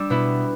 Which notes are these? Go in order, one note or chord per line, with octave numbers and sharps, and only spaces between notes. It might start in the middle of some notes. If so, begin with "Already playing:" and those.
Already playing: G3 D4 D6 E6
B2 B3 E4